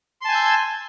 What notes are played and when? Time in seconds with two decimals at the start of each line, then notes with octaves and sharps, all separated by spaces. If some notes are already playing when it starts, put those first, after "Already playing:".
0.21 C6
0.25 A5
0.28 G#5
0.32 G6
0.35 E6